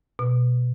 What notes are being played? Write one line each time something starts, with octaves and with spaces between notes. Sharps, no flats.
B2